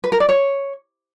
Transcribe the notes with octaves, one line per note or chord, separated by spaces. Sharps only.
B4
A#4
D5
C#5